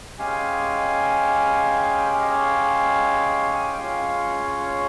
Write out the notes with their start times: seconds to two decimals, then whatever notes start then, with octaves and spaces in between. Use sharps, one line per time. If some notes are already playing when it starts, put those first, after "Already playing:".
0.18 G#3 C#4 G4 F5 G#5
1.97 G5
2.09 F5
2.21 D#5
2.31 C#5 F5
3.54 G#5
3.65 G5
3.77 G#3 C#4 F4 C#5 F5